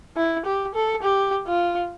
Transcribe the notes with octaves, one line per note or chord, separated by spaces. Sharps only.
E4
G4
A4
G4
F4